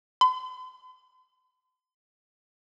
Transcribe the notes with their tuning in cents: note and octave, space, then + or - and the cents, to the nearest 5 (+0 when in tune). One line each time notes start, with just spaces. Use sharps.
C6 -45